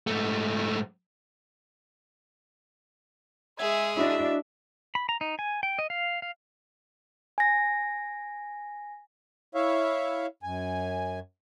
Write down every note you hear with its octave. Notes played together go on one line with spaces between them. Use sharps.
G#2 A3
G#3 G#4 E5 G#6
D4 E4 F#4 D#5 E5
B5
A#5
D#4
G#5
G5
D#5
F5
F5
G#5 A#6
E4 C#5 E5 F5
F#2 G#5